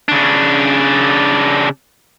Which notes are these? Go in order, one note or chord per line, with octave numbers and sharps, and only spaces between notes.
C#3 D4